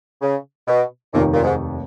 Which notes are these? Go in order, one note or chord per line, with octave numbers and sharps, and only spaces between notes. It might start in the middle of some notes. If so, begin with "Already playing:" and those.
C#3
B2
F1 D#2 A#2 D#3
A#2
G#2